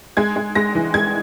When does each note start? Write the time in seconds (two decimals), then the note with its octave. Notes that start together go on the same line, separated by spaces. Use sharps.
0.17 G#3 G#6
0.36 G#3
0.55 G#3 A#6
0.75 E3
0.94 G#3 G#6